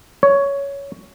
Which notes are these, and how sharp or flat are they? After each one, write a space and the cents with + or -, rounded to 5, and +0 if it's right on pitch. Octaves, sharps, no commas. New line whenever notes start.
C#5 +10